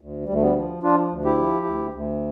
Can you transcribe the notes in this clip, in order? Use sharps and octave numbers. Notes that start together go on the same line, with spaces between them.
D2
D2 G3
A3
G3 B3
F3
F3 D4 F4
D2
E4 G4
F3
D2
D2